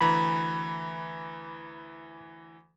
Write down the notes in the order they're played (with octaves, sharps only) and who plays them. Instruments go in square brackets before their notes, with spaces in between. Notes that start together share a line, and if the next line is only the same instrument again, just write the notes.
[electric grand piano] D2 E3 A#5 [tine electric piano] B5